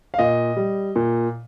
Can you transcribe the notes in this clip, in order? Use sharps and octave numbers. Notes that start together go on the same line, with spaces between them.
F5
A#2 D#5
G3
A#2